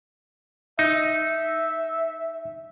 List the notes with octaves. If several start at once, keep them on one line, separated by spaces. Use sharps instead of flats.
D#4 E5